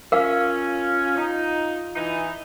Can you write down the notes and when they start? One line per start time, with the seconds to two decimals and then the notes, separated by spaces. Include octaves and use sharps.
0.12 C#4 F4 A#4 F5
1.16 D#4
1.95 E3 D#4